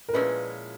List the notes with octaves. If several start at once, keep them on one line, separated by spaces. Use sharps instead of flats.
A#4
A#2 F3 G#3 C#4 E4 B4